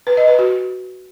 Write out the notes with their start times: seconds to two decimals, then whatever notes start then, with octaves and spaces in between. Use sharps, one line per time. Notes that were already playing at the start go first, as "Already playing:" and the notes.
0.07 B4
0.17 D#5
0.28 B4
0.39 F#4